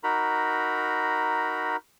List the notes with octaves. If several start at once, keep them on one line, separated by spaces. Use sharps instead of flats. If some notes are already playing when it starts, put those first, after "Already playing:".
D#4 F#4 A#4 A#5 B5